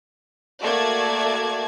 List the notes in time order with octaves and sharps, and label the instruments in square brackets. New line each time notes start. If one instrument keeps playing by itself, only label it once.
[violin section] A3 A#3 F#4 D5 A5 G#6